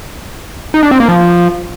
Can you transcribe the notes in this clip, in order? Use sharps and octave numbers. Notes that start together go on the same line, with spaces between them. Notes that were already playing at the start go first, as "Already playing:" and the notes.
D#4
D4
C4
A#3
F3